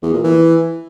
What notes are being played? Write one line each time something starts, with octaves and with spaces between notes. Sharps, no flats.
E2
A#2
E3